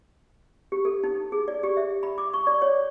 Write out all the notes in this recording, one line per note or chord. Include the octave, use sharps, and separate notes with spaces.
G4
A4
D#4
G#4
D5
G4
E5
B5
D6
C#6
D5
C#5